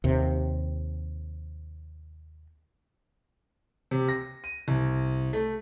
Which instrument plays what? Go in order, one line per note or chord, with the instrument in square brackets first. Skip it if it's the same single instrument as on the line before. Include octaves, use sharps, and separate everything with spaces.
[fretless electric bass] D#2 C3
[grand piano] C3
A#6
D#7
C2
A3